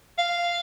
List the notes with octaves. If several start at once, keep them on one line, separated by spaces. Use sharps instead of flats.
F5